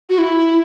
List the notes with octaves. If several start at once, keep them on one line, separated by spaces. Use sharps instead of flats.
F#4
E4